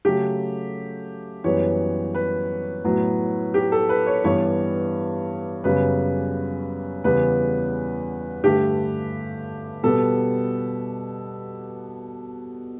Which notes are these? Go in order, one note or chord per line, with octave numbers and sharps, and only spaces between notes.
C#3 F#3 A3 G4
F#2 E3 G3 B3 C#5
B4
A2 F#3 B3
G4
A4
B4
C#5
G2 E3 G3 B3 C#5
F#2 C#3 G3 B3 B4
E2 C#3 G3 B3 B4
G2 D3 A3 G4
B2 G3 B3 A4